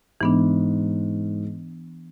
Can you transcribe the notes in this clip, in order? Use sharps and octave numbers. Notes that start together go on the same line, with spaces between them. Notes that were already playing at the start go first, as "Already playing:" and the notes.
G#2 E3 B3 D4